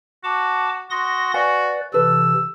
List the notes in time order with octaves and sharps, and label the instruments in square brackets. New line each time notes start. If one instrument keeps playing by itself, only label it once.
[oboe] F#4 [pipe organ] A5 D6
[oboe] F#4 [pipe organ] C6 D#6 A#6
[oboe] F#4 [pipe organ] B4 D5 [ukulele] F5 G#5
[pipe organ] C3 E3 [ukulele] A4 B4 [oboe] E6